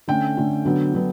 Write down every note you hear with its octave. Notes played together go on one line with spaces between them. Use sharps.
D3 A3 C#4 G5
D3 A3 C#4
D3 F#3 B3 D4
D3 F#3 B3 D4